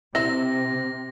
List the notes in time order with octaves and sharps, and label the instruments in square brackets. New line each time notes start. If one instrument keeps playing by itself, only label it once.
[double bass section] C3 [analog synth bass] C4 [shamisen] E4 E5 [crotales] A#6